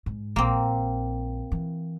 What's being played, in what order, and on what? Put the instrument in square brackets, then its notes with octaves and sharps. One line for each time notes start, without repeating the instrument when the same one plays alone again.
[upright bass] G#2
[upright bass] A#1 [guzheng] A#3 C4
[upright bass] E3